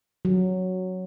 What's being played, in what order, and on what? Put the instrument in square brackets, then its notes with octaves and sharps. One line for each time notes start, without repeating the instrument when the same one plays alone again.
[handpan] F#3